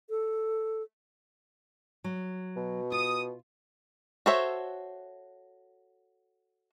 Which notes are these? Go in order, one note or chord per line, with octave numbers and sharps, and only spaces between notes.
A4
F#3
B2
F4 D#6
F#4 A4 C5 C#5 E5